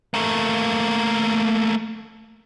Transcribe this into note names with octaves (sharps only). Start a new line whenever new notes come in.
A3 A#3